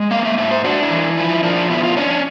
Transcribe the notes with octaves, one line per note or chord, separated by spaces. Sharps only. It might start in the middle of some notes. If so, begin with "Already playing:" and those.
Already playing: G#3
A#3 F5
E5
G#2 E5
C5
D4 F#4
E4
E3
F3 E4
F3 D4
B2 E4
F4
C#4 D4
D4